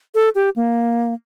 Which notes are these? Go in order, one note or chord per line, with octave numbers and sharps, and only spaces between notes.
A4
G4
A#3